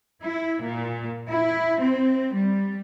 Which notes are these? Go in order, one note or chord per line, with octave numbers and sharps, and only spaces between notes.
E4
A#2
E4
C4
G3